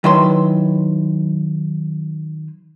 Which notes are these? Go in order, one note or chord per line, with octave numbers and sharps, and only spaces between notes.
D#3 F#3 E4 B4 C6